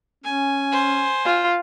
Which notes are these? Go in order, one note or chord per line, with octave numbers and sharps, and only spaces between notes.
C#4 G#5
C5
F4